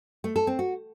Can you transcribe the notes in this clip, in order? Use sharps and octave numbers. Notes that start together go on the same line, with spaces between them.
A3
A4
C4
F#4